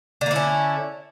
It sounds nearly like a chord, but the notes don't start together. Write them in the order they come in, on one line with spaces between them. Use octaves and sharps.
D3 A#3 E4 C#4